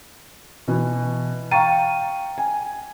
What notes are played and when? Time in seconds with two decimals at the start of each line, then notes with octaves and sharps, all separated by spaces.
0.68 B2 E3 B3
1.51 F5 G5 A#5 C#6 A6 D#7
2.38 G#5